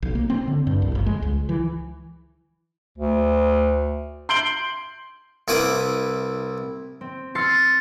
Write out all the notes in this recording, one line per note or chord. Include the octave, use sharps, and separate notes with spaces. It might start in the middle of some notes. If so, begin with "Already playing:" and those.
B1
A#3
C4
D3
G2
C2
G1
G#3
C#2
E3
D2
C6 G6 C7 D7 F#7 G7
C2 E4 B4 D6 D#6
C4
C6 E6 F6 A6 C7 C#7